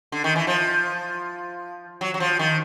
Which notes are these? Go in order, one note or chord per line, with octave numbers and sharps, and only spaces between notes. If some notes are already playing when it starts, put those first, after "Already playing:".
D3
D#3
E3
F3
F#3
F#3
F3
D#3